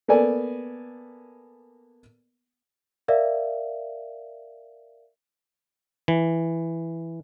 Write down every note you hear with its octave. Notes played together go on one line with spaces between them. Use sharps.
A#3 B3 A4 D5 G#5
A#4 D5 E5 F5
E3